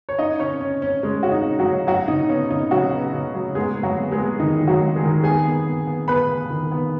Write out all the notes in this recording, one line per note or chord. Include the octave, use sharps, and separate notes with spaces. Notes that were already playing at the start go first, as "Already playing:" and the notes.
C#5
C#4 D#4 D#5
C#4 C#5
C#4
C#4
G#3 C#4
C#4 F#4
D#4
C#4
F#3 F#4
C#4
F#3 F#4
C#3 D#4
B3 C#4
C#3 D#4
C#3 F#3 F#4
B3
C#3
F#3
G#3 B3 G#4
G#3
F#3 F#4
B3
G#3 G#4
B3
D#3 D#4
D#3
F#3 F#4
G#3
G#3 G#4
D#3
B3 G#4 G#5
B3
B3
B3
B3 B4 B5
B3
D#3
B3